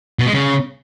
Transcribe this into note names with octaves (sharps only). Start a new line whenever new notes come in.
B2
G#3
C#3